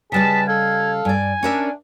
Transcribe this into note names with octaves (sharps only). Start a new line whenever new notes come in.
C#3 G3 G#4 B4 D#5 A5 B6
A4 F5 G#6
G2 D5 G#5
C#4 D4 A#4 E5